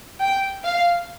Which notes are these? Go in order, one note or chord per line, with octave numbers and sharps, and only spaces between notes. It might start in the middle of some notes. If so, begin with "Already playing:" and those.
G5
F5